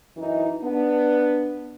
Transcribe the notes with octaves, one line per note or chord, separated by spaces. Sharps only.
F#2 E3 D#4
B3 D4